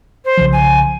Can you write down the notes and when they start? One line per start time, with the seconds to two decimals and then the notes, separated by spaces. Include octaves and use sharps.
0.25 C5
0.38 B1 C#3 F3
0.52 G#5